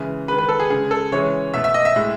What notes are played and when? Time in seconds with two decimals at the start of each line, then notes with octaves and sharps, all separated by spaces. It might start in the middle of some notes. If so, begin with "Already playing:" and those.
Already playing: C#3 E3 G#3
0.28 G#3 B4
0.32 D#3
0.38 B4
0.49 A4
0.60 G#4
0.70 C#3 G#3 G#4
0.91 A4
1.12 C#3 E3 G#3 C#5
1.54 B2 A3 E5
1.64 E5
1.74 D#5
1.85 E5
1.96 A2 G#3